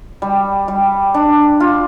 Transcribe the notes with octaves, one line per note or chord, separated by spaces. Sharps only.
G3
G3
D4
F4